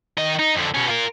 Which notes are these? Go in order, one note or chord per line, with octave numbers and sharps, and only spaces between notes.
D#3 D#5
D#4
F2 D3
B2 C#4
F4 A#4